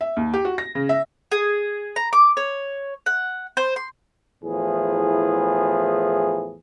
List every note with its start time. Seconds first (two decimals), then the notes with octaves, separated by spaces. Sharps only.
0.01 E5
0.17 D#2
0.34 G4
0.45 F#4
0.58 A#6
0.75 C#3
0.89 E5
1.32 G#4
1.96 A#5
2.13 D6
2.37 C#5
3.06 F#5
3.57 C5
3.76 C6
4.44 E2 A2 F3 E4 G#4